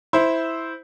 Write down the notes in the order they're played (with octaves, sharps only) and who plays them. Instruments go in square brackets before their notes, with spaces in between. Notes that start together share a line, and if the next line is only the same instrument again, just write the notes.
[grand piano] E4 C5